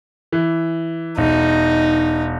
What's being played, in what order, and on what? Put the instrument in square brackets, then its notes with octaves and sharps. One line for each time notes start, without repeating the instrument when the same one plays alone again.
[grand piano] E3
[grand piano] E1 [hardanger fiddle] D#4